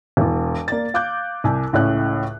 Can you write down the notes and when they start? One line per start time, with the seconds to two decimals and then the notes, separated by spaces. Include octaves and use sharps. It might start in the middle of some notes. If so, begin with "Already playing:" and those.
0.17 E1 E2
0.68 A#3 D5 A6
0.94 F5 D6 F#6 G6
1.44 C2 G#5
1.73 C#2 A2 C#3 C#4 C#5 F#6